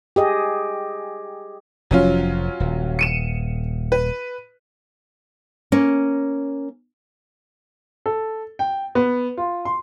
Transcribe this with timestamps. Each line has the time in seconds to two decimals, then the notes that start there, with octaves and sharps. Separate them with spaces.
0.16 G4 G#4 D#5
1.91 F1 F3 F#3 C#4 F4
2.60 D#1
2.99 C#7 D#7 E7
3.92 B4
5.72 A#3 C#4
8.06 A4
8.59 G5
8.95 B3
9.37 F4
9.65 C6